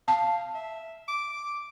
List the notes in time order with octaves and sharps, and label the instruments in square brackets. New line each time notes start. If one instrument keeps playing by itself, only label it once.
[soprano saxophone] F5 [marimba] A5
[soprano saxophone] E5
D6